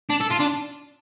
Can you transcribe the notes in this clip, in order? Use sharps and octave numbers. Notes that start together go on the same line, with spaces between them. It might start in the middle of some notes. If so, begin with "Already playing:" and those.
D4
A4
F4
D4